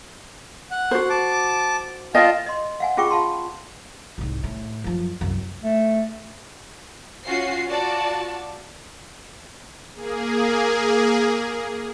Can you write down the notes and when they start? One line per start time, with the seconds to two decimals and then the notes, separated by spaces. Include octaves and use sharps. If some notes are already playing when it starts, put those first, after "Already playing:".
0.71 F#5
0.91 F#4 C5
1.10 A5 D6
2.14 F4 D#5 F5 G5 A5
2.46 D#5 C6
2.80 F5 F#5 G#5
2.97 C#4 F4 G#4 G5 C#6 D6
3.11 F4 F5 A5 C6
4.18 C2 G#2
4.44 A2
4.84 F#2 F3
5.21 C2 F#2
5.62 A3
7.27 C#4 F4 F#4 C7
7.69 F4 F#4 D5 A5
9.94 A#3 G#4